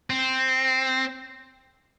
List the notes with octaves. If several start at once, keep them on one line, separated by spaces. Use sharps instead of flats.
C4